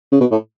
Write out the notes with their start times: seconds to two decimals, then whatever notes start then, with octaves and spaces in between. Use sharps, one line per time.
0.12 C#3
0.20 B2
0.31 A2